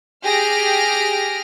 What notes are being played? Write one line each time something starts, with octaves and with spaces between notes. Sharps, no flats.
G4 G#4 F6 A#6 D7